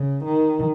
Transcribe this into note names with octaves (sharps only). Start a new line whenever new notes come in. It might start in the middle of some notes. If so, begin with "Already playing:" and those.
Already playing: C#3
D#3